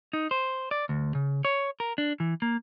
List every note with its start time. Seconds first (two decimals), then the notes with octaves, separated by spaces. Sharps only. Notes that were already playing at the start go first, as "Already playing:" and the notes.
0.13 D#4
0.31 C5
0.71 D5
0.89 D2
1.15 C#3
1.45 C#5
1.80 A#4
1.98 D4
2.20 E3
2.42 A#3